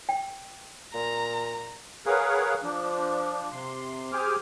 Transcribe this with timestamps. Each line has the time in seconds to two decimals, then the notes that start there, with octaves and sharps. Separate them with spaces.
0.09 G5
0.94 A#2 A#5
2.06 G#4 A#4 B4 C#5 F5 F#5
2.63 F3 D4
3.52 C3 C6
4.12 G4 G#4 C5 G#5 D6 F6